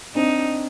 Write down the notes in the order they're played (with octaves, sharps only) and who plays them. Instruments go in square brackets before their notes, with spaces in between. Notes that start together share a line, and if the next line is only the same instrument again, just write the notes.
[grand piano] C4 D4 [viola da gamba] D#4